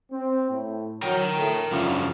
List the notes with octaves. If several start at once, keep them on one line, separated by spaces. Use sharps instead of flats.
C4
A2
F#3 A#4 G5
A2 A3
F#2 C#3 F3 D4 E4 F4